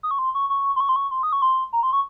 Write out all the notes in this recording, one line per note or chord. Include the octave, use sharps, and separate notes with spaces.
D#6
C#6
C6
C#6
C#6
C6
C#6
C6
C#6
C6
D#6
C#6
C6
A#5
C6
C#6